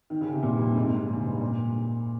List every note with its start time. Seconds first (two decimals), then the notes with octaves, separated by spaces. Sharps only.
0.10 D#3
0.21 C#3
0.32 C3
0.43 A#2
0.52 G2
0.59 F2
0.67 G2
0.76 G#2
0.87 A#2
1.08 C#3
1.25 G2
1.41 A#2